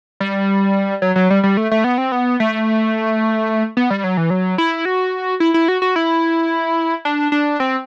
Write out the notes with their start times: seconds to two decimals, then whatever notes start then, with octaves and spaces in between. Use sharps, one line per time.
0.20 G3
1.02 F#3
1.16 F#3
1.30 G3
1.43 G3
1.57 A3
1.71 A3
1.84 B3
1.98 C4
2.12 B3
2.40 A3
3.77 B3
3.90 G3
4.04 F#3
4.17 E3
4.30 F#3
4.58 E4
4.85 F#4
5.40 E4
5.54 E4
5.68 F#4
5.82 F#4
5.96 E4
7.05 D4
7.32 D4
7.60 C4